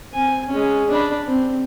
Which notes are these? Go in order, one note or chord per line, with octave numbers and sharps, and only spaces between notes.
C4 G#5
G#3 C#4
D4 B5
C4